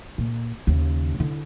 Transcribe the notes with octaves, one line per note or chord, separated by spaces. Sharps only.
A#2
D#2 C#3
D3 E4